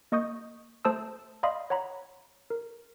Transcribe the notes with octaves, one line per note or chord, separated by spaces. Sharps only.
A#3 D#5 C#6 D#6 G6
A3 C5 A5 D#6 E6
D5 D#5 F5 B5 C6 D#6
C#5 F#5 A#5 B5
A#4